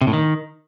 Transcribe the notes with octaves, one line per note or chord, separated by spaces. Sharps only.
C3
A2
D#3